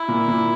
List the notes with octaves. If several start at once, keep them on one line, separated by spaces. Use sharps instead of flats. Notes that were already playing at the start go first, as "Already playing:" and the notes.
Already playing: E4
A#2
A#2